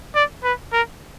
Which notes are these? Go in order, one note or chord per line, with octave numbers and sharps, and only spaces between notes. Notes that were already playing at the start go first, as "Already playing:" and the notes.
D5
B4
A#4